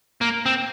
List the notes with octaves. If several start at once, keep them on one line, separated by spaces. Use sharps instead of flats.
A#3
C4